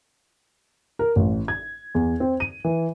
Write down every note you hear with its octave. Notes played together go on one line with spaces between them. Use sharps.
A#4
A1
G#6
E2
C4
D#7
E3